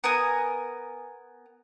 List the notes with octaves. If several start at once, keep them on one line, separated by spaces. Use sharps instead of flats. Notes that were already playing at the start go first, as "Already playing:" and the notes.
B3 A#4 G#5 D#6